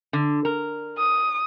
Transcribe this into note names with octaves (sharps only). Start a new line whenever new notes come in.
D3
A#4
D#6